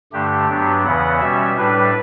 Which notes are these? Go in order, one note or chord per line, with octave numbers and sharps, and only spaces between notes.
G2 D3 A3 D4 G4
G2 F#3 B3 D4
E2 C#3 E3 B3 F#5
B2 G3 C#4 E5
A2 G3 D4 B4